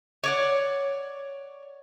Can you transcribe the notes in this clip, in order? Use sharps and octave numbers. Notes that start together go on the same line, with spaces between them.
C#5 D5 F#5